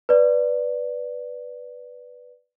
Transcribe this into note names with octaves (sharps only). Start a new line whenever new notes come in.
B4 D5